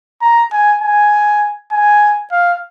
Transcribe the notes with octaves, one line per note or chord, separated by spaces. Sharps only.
A#5
G#5
G#5
G#5
F5